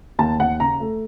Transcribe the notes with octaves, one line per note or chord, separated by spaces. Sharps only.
D#2 A5
D#2 F#5
C#3 A#5
A3